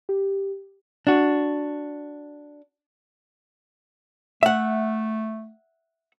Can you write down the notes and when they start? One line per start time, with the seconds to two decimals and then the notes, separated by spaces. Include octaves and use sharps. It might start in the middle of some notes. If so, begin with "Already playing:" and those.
0.09 G4
1.07 D4 F#4
4.43 A3 E5 F#5